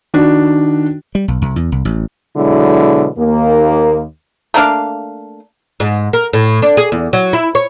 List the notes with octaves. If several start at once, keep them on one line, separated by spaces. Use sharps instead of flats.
D#3 D4 F#4
G3
B1
C2
E2
C2
A1
B2 D3 F#3 G#3 E4
D#2 A#3
A3 A#3 D4 F5
G#2
A#4
A2
D4
G#4
E2
F#3
E4
C#5